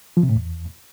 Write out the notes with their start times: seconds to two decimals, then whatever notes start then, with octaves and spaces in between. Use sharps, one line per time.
0.17 F3
0.23 C3
0.29 A2
0.36 E2